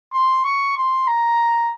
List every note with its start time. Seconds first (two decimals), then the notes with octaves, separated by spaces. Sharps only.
0.13 C6
0.44 C#6
0.77 C6
1.07 A#5